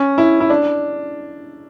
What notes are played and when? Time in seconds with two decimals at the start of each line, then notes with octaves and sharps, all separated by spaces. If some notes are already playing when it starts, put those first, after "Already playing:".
Already playing: C#4
0.18 E4
0.40 E4
0.50 D4